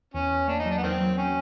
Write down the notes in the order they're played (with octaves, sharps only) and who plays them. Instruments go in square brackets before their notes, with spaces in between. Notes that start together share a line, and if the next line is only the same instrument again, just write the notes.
[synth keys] E2 [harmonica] C#4
[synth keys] E2
[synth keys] A#3 [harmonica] D4
[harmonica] D#4
[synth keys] F#3
[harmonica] D4
B3
[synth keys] E2 [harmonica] D#3 C4
[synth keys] F#3
[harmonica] C#4